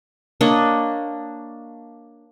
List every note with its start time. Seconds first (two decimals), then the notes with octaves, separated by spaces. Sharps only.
0.41 A#3 D4 C#5 D#5